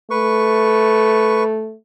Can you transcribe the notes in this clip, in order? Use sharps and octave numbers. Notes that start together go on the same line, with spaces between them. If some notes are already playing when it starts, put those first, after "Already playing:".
A3 B4 C#6